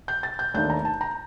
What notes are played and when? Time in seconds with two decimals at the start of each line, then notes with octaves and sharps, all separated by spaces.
0.08 G6
0.23 A6
0.39 G6
0.54 D#2 D#3 A3 D4 G6
0.70 A#5
0.85 A5
1.01 A#5